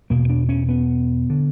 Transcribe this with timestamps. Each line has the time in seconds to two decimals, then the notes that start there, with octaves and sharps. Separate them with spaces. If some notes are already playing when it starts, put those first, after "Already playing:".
0.10 E2 B2 A#3
0.30 D4
0.49 C#4
0.69 B3
1.30 D3